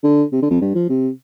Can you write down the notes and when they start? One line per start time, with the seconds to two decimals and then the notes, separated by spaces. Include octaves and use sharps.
0.04 D3
0.32 C3
0.42 D3
0.50 F2
0.61 G2
0.75 F3
0.89 C3